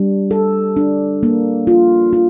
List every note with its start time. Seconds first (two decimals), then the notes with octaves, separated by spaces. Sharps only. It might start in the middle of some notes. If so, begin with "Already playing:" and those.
Already playing: G3 D4
0.31 A4
0.76 D4
1.23 A#3
1.67 F4
2.13 F4